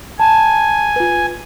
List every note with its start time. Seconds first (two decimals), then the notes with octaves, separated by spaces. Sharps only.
0.20 G#5 A5
0.96 F4 B4